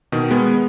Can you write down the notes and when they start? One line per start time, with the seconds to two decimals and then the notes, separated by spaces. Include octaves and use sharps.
0.12 B2 D#3
0.30 G#3 B3